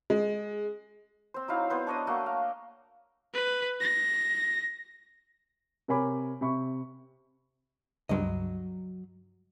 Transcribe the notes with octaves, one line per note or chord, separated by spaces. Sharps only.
G#3
C4 C5
F#3 D#4 E4 F5
B3 C5
D4 C#5 D#5 D#6
A3 A#3 F#4
F5
B4
A#6
C3 A#4 C#5 G#5 B5 D6
C3 E5 B5 C#6
C#2 G2 F#3 D#5